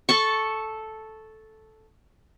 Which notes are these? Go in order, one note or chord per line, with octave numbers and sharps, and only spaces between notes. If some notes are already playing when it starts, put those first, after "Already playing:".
A4 A5 C#6